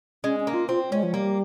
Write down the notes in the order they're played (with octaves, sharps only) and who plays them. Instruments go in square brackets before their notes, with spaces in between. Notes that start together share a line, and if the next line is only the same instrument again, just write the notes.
[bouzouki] G#3 [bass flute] C#4
[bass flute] C#4
[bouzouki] A#3
[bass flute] F4
[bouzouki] C4 [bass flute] F4
[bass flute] G#3 [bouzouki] C#4
[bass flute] F3
[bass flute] G3 [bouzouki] A#3